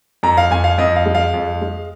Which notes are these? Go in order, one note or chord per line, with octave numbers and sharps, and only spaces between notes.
F2 A#5
F5
F2 G#5
F5
F2 D#5
F5
G#3
F5
F2
G#3